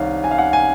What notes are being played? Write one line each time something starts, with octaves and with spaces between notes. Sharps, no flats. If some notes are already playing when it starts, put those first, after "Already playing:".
Already playing: C2 C3 D#3 C#5 F5
G#5
F5
F#5
G#5